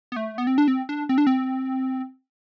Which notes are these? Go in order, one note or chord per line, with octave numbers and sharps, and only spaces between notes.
B3
A3
B3
C4
D4
C4
D4
C4
D4
C4